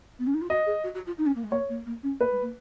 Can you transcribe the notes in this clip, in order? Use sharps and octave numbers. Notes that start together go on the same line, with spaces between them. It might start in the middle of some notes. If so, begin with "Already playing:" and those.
B3
C#4
D#4
F4
F#4 D#5
G#4
F#4
F#4
F4
D#4
C#4
A#3
G#3
A#3 C#5
A#3
A#3
C#4
A#3 B4
G#3
A#3